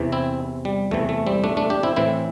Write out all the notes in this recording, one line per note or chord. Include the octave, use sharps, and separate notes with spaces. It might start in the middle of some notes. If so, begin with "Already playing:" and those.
Already playing: E2 C3 E3
C4 E4
G3
E2 C3 E3 A3
A3
G3 C4
A3 D4
A3 D4
D4 G4
C4 E4
A2 E3 C4 E4